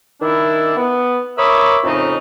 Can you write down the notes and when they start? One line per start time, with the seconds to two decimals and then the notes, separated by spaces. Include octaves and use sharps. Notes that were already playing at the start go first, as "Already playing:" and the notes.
0.21 D#3 D4 E4
0.76 B3
1.37 A#4 C#5 E5 B5 D6 D#6
1.84 F2 A2 C#3 D#4